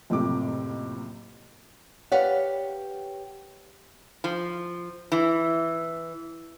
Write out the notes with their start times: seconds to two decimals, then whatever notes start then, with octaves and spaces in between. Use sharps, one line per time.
0.10 F#1 F2 A2 C3 G4 D6
2.12 G4 B4 C#5 D5 F5 F#5
4.24 F3
5.12 E3